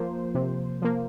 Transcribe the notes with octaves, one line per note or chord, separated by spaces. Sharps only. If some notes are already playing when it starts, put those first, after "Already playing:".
Already playing: F3 A#3 C5
C3
F3 A#3